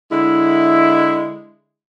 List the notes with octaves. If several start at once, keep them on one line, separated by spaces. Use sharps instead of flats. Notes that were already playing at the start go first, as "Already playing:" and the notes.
D3 G#3 E4